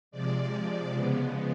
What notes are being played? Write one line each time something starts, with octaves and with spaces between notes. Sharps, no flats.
C3 F3 G#3 D5
C#3 F3 G#3 B3